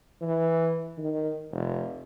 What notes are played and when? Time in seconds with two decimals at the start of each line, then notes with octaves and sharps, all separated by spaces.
0.21 E3
0.98 D#3
1.52 F1